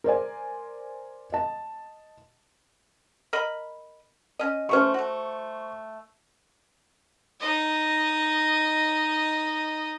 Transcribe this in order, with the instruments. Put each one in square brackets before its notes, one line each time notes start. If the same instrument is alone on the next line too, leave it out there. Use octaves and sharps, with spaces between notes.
[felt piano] A#4 C5 D5 G#5
D#5 A5
[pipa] A#4 D#5 B5
C#4 D#5
[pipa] E3 A3 C#4 [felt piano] C5 C#6
[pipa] A3 F#4
[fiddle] D#4 D#5